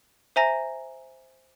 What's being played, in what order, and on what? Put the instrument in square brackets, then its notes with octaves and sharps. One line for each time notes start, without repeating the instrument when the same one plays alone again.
[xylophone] C5 E5 G#5 A#5 A#6